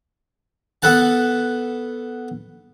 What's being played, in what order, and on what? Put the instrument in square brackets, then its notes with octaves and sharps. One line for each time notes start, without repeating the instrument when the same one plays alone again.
[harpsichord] B3 A4 B4 F#5 A5